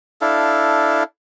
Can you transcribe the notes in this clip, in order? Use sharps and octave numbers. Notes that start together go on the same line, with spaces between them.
D4 E4 A4 F5